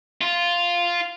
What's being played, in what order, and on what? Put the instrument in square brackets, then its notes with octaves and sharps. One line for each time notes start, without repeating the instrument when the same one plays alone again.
[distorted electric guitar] F4